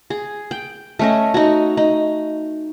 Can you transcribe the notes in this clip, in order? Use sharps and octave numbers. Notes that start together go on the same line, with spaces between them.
G#4
G5
A3 C#4 D#5
D#4 F#4
D#4